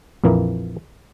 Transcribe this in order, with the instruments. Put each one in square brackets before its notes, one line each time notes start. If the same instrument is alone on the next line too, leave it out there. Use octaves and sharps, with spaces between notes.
[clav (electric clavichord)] A#1 F2 E3 A#3